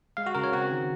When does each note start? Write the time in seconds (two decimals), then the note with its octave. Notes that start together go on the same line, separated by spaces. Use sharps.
0.17 G#3 F5
0.26 F#4
0.35 C#3 A#4
0.44 C#5
0.53 C4 F#4
0.71 D#3